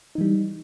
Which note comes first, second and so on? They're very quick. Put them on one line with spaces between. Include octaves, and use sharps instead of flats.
D#4 E3 G3